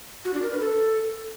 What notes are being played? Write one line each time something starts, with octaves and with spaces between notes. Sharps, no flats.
F#4
D4
A#4
B4
A4